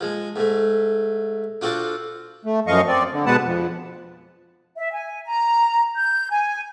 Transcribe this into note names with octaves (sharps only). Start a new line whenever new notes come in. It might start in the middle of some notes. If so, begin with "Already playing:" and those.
F3 G#3
G#2 A3
D4 F4 F#4 A4 C5 D5
A3
F#2 F3 D#5 F5 C#6
C4 D5
D3
B2 G#3 B3 B4 F#5 A5
F2
E5
G#5
A#5
G6
G#5